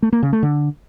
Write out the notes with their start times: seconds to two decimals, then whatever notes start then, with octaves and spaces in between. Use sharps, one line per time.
0.02 A3
0.13 A#3
0.23 C#3
0.33 A3
0.43 D3